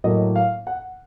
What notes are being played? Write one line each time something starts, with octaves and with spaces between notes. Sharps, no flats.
A2 F#3 A#3 D#5
F5
F#5